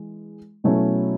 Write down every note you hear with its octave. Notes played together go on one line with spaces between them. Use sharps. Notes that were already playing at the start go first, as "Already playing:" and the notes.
Already playing: E3 G#3
B2 F#3 A3 C#4 E4